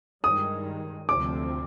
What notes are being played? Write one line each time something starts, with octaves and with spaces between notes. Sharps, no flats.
G2 D#3 G#3 D#6
D2 C3 F3 C4 D6